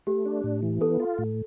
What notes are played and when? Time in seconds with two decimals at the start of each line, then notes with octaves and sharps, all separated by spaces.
0.07 A3 G4
0.26 D4
0.44 A2
0.62 E3
0.81 B3 A4
1.00 F4
1.18 A2